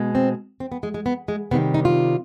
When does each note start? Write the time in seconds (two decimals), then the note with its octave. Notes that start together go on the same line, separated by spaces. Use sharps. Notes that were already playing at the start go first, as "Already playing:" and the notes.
Already playing: B2 G#3
0.15 C4
0.60 C4
0.72 B3
0.83 G#3
0.94 G#3
1.06 B3
1.28 G#3
1.51 C3 D#3 G3 B3
1.74 D#4
1.85 F4